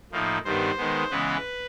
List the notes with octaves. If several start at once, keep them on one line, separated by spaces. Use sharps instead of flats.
A2 F3 A#3 D#4
G2 D#3 G3 B3 C5
D#3 G#3 B3
C#3 E3 G#3 B3 B4